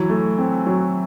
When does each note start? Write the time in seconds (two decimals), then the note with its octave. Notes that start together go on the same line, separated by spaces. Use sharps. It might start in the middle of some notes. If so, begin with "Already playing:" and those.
Already playing: E3 F#3
0.10 A3
0.38 C4
0.66 F#3